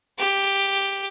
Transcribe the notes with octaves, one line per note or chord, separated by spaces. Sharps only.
G4